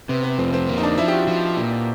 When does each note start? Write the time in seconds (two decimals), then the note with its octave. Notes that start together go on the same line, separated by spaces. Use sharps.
0.09 C3 B3
0.23 B3
0.38 F2 C4
0.54 C4
0.69 A#3
0.78 D#4
0.83 D4
0.97 F3 E4
1.08 G4
1.13 F#4
1.28 F3
1.57 A#2